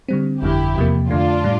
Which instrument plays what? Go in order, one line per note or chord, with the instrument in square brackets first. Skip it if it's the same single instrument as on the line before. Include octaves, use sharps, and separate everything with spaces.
[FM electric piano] D3 G3 C4
[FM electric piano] G1 F2 D3 G3 [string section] E4 G4
[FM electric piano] E2 C3 F3 A#3
[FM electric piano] F2 D3 A3 [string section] D4 F4
[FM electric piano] A2 G3